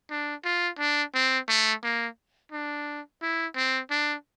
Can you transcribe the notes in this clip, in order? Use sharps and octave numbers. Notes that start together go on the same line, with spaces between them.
D4
F4
D4
C4
A3
A#3
D4
E4
C4
D4